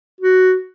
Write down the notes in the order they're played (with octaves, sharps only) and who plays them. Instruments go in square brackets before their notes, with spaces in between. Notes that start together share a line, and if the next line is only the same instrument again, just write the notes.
[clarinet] F#4